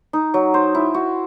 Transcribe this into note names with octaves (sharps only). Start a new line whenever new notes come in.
D#4
F#3
C5
E4
F#4